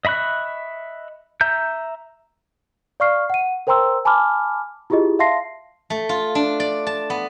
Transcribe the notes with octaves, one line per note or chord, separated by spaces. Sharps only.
D#5 E5 B5 C#6 F#6
E5 A#5 G6
D5 F5 C#6 F6 C7
F#5 D#7
A#4 C5 G5 A#5 C6 E6
G#5 A5 B5 D6 F6
E4 F4 G4 G#4 D#5
E5 F5 A5 C6 A#6 C7
A3
F4
D4
D5
A5
B3